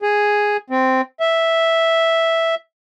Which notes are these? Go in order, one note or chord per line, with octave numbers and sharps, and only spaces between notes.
G#4
C4
E5